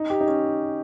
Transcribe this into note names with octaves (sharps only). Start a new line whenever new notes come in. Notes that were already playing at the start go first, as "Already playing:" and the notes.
Already playing: D#4
G4
D#4
C#4